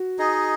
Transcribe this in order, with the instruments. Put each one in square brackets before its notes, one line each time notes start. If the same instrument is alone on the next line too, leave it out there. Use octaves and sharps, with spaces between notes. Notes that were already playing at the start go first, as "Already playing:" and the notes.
Already playing: [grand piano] F#4
[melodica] D#4 G#4 D#5